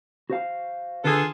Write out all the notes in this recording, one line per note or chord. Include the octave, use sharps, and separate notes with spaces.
F#4 C5 F5
D3 F4 G#4 A4 B4